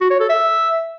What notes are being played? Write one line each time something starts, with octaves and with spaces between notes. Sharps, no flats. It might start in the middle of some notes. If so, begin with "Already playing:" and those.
F#4
C#5
A4
E5